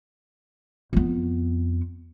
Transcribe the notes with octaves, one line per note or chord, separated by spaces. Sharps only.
F2 B3